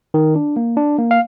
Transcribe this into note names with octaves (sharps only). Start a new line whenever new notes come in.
D#3
D4
A#3
D4
A#3
F5